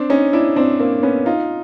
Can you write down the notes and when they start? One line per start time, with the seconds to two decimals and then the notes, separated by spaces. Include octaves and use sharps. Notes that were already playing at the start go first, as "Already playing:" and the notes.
Already playing: C4 D4
0.10 C#4 D#4
0.33 D4 E4
0.56 C4 D4
0.80 A#3 C4
1.03 B3 C#4
1.26 D#4 F4